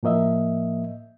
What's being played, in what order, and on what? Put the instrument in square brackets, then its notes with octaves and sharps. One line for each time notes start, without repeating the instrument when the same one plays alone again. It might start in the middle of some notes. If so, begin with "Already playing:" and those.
[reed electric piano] A2 F3 A#3 D#5 E5